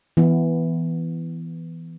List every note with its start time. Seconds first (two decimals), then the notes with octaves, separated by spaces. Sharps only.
0.17 E3 B3